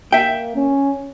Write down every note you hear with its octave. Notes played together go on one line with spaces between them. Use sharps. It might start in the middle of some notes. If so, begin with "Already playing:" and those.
A#3 E5 G5
C#4